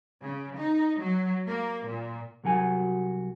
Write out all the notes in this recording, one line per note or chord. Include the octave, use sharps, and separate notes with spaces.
C#3
D#4
F#3
A#3
A#2
C2 F#3 F#4 G#5